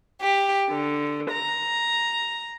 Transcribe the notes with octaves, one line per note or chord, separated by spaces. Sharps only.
G4
D3
A#5